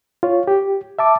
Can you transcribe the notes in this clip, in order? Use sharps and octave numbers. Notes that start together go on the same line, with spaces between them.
F4 C#5
G4
E5 A5 D6